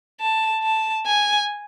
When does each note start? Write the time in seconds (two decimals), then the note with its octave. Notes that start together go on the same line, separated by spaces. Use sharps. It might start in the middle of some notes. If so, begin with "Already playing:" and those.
0.20 A5
0.63 A5
1.06 G#5